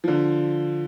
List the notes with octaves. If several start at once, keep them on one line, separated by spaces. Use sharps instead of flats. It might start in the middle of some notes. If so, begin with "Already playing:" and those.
D3 F3